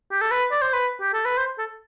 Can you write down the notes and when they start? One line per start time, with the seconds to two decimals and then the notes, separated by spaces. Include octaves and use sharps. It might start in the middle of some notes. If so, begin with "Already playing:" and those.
0.12 G4
0.21 A4
0.31 B4
0.52 D5
0.62 C5
0.73 B4
1.01 G4
1.13 A4
1.25 B4
1.38 C5
1.58 A4